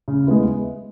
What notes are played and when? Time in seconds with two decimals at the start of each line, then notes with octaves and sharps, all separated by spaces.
0.08 C#3
0.27 G#3 B3 E4